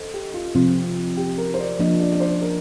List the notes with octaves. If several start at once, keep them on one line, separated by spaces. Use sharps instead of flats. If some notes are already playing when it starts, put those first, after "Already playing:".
Already playing: A4 C5 D#5
G4
F4
C3 F3 C4 F4
G4
A#4
C5
D5
F3 A#3 D4 D#5
D5
D5
C5
A#4